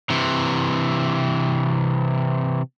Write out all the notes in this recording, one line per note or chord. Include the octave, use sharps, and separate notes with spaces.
C3 E3